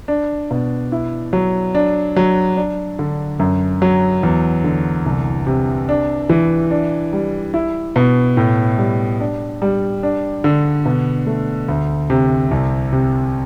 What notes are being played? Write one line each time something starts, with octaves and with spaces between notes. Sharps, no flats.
D4
B2
E4
F#3
D4
F#3
D4
D3
F#2
F#3
E2
D3
C2
C3
D4
E3
D4
G3
E4
B2
A2
G3
D4
G3
D4
D3
B2
A3
D2
C3
C2
C3